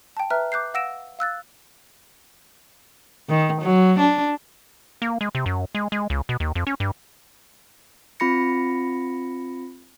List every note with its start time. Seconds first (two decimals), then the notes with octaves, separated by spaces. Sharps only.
0.17 G5 A5
0.30 B4 E5 A#5 F6 F#6
0.52 D6 F#6 G6 C7
0.74 F5 F#5 E6 A#6 D7 E7
1.19 F5 E6 F#6 A6
3.29 D#3
3.61 F#3
3.99 D4
5.02 A#3
5.21 G#3
5.35 C3
5.46 F#2
5.75 G#3
5.92 G#3
6.10 C#2
6.29 B2
6.40 D#2
6.55 F2
6.67 C#4
6.80 G2
8.20 C4 F4 B5 A#6 C#7